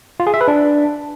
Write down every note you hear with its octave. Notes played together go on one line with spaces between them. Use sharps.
F4
G#4
E5
B4
D4